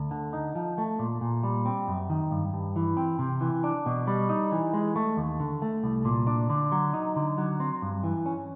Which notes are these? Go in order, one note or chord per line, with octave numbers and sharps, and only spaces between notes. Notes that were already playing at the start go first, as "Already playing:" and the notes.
Already playing: D2
D3
D#4
F3
A3
A#2
A#2
G3
C4
F#2
D#3
G2
G2
E3
C4
C3
E3
D4
B2
G3
D#4
E3
G#3
A3
D#2
D3
A3
C2
A#2
D4
D3
F#3
D#4
D3
F#3
C4
G2
E3
C#4